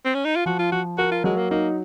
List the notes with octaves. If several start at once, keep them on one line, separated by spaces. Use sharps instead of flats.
C4
C#4
D#4
F4
F3 F#4
F4
F3 F#4
F#4 A#4
F4
F#3 G#3
A#3
A#3 D#4